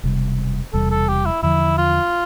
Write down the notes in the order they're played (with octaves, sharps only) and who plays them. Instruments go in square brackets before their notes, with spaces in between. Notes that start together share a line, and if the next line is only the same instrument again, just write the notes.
[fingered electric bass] E1 E2 C3 G3
[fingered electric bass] E1 E2 C3 G3 [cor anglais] A4
[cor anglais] A4
G4
E4
[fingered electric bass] E2 D3 F3 [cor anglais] E4
[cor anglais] F4